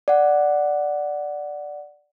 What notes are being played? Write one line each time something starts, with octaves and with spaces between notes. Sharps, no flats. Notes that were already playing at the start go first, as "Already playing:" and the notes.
D5 F#5